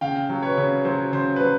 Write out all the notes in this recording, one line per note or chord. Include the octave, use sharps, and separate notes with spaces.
C#3 F5 G5
F#3
B4 C#5
C#3
F#3 C5
C#3 C5
B4
F#3 C5